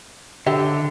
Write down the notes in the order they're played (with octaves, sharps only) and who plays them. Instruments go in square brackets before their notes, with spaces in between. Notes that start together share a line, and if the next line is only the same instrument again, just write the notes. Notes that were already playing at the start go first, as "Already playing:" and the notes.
[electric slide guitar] D3 [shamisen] F#3 G4 E5